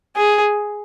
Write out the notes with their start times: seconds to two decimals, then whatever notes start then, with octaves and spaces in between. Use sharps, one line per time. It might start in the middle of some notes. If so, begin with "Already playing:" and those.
0.17 G#4